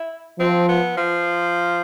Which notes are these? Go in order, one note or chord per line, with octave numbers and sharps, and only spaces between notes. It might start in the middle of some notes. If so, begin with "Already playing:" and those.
Already playing: E4
F3 C4
B3
F3